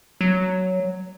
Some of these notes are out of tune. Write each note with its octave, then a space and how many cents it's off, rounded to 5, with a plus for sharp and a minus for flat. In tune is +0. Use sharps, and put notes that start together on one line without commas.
F#3 +5